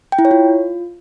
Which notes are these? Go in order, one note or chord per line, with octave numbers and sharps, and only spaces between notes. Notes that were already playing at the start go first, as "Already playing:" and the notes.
G5
E4
C#5
F4